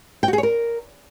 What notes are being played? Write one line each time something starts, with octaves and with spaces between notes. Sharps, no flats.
G5
F#4
G#4
C#5
A#4